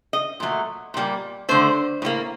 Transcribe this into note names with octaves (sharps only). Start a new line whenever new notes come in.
D#5
A#2 F#3 A3
A#2 G3 A#3
D3 A3 C5
A2 G3 A#3